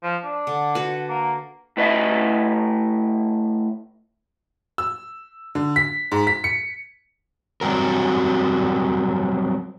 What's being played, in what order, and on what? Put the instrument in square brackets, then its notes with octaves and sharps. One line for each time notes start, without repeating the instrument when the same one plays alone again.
[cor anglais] F3
D4
[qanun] D3
F#4 B4
[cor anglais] A#3
[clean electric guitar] A2 B4 D#5 E5
[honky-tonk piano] E6
D3
B6
G#2
B6
C#7
[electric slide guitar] F#3 G3 C4 F#4 A#4